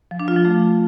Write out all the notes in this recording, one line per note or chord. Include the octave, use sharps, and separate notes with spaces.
F3
D4
F4
F3
A3